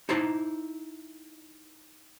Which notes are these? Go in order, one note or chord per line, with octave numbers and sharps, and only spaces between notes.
D#4 E4 C5 A5 A#5